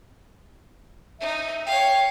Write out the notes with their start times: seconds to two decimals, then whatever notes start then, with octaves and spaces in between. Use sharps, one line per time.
1.20 D#4 E5
1.66 C#5 F5 G5